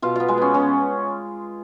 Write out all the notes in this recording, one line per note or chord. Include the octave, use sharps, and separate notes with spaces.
B2 F4 F5
B3 F4 F5
G#3 G#4
B3 C#4
B2 C#4